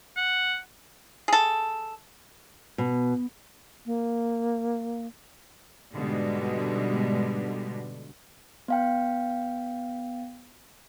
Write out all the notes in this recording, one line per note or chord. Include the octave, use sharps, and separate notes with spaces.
F#5
G#4 A4
B2
A#3
G#2 B2 D3 G3 G#3
B3 F5 G5